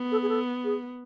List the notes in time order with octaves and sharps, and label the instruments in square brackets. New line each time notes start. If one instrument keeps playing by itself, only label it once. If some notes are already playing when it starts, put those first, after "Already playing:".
Already playing: [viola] B3
[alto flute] A4
G#4
A4
G#4